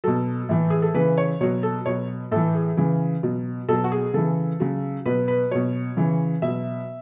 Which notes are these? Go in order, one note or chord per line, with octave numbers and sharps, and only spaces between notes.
B2 F#3 A4
A2 E3
G#4
A4
C#3 E3 B4
C#5
B2 F#3 C#5
A4
B2 F#3 C#5
A2 E3 A4
G#4
C#3 E3
B2 F#3
B2 F#3 A4
F#4
G#4
C#3 E3 A4
C#3 F#3
B2 F#3 B4
B4
B2 F#3 C#5
C#3 E3
B2 E5
F#3